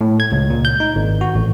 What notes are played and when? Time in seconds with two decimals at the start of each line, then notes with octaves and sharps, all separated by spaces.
0.01 A2
0.20 G#6
0.32 C#2
0.50 A#2
0.65 G6
0.80 D#4
0.95 G#1
1.21 F#4
1.35 A1